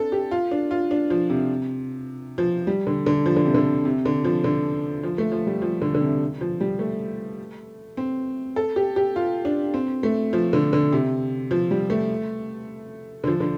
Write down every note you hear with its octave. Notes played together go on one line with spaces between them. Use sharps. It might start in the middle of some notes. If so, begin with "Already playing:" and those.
Already playing: C4 D4 A4
G4
F4
D4
F4
D4
F3
C3
F3
G3
D3
D3
F3
D3
C3
D3
C3
D3
F3
D3
F3
A3
F3
G3
F3
D3
D3
C3
F3
G3
A3
C4
A4
G4
G4
F4
D4
C4
A3
F3
D3
D3
C3
F3
G3
A3
D3
F3
D3